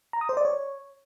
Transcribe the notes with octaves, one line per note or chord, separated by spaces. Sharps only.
A#5
D#6
C5
D5
C#5